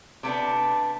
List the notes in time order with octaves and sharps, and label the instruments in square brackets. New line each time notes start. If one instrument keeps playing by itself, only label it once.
[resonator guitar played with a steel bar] C3 A3 B3 D4